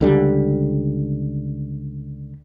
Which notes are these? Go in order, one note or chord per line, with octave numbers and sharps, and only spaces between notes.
C#2 D3 G3